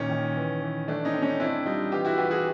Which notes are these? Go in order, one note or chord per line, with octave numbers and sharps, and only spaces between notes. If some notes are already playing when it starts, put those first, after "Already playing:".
Already playing: A#2 D#3 C#4
D#3
E3
E3
A3 D4
C#4 D#4
C4
C#4 D#4
C4 D4 E4
G3 D#4 F4
E3 F4 G4
E4 F#4
E3 F4 G4
F#4 G#4